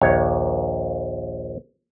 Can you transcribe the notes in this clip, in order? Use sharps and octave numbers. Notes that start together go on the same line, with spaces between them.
A#1 D#2 C#5